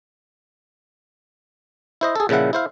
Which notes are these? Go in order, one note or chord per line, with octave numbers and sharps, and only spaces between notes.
E4 C5 D#5
G#4 A4
A#2 C#3 F3 E4 F#5
E4 C5 F5